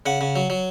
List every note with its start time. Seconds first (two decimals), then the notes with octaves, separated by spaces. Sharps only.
0.06 C#3 F#5
0.21 C#3
0.36 F#3
0.50 F#3